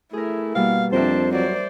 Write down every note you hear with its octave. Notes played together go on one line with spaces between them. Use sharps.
A3 E4 G#4 A#4
B2 G3 A#3 F5
F2 D4 G4 A#4 C5 E5 A5
F#3 C5 D5